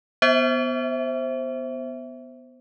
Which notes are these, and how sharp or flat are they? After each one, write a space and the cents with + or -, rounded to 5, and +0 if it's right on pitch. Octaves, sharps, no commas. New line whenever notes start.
B3 +0 C5 +10 E5 -5